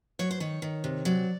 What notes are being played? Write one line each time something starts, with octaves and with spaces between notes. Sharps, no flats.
F#3 C#5
C5
D#3 C#5
D#3
C3
F#3 D5